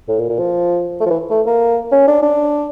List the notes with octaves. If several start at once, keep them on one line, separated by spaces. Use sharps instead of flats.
A2
A#2
A#2
F3
A3
F3
E3
A3
A#3
C#4
D4
D4